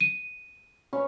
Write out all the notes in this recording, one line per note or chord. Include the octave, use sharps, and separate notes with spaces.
D#7
C#4 B4 C#5